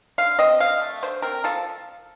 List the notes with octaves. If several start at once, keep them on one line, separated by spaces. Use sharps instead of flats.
D3 F5
C4 D#5
D3 F5
A3
D3 C5
C4 A#4
F3 A4